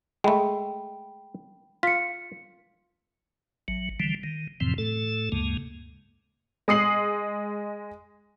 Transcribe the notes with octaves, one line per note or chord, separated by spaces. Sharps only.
G#3 A3 G5 B5
F4 B6 C#7
A1 F#3
D3 E3 F3 G3
D#3
F2 A2 C3 E3 F3 C4
A2 A3 A4
D2 G2 C#3 G#3 A#3
G#3 D#6 C7 F#7